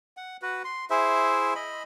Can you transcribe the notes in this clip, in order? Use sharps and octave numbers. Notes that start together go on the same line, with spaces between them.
F#5
F#4 B4
C6
E4 G#4 C5 E5
D#5 B5